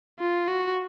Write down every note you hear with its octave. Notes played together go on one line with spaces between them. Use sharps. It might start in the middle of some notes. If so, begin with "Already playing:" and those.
F4
F#4